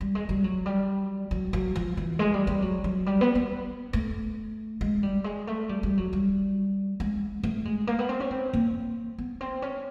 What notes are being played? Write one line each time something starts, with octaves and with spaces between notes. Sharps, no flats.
G3
G#3
G3
F#3
G3
F#3
F#3
F3
E3
G#3
G3
G3
F#3
F#3
G3
B3
B3
A3
G#3
G3
G#3
A3
G3
G3
F#3
G3
G#3
A3
G#3
A#3
B3
C4
C#4
C4
A#3
B3
C4
C#4